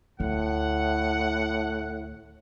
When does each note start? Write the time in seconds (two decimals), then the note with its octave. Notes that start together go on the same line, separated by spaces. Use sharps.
0.20 D2 A2 F#5